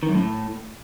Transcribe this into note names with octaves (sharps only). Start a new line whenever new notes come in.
D#3
F#2
A2